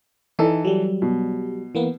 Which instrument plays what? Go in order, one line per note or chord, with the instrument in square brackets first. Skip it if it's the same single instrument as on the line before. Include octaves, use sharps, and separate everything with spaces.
[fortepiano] E3 A4 [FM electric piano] D#4
[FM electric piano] F#3 G3
[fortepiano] B2
[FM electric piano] E3 A#3 B3